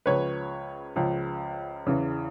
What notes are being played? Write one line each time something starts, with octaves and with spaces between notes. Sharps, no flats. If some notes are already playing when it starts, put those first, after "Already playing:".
C#2 C#3 F3 B4 C#5
C#2 C#3 F3
E2 C#3 E3